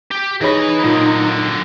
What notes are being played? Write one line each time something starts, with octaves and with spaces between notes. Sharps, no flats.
G4
E3 D#4 G#4 C#5 B5 A#6
A#2 D3 F#3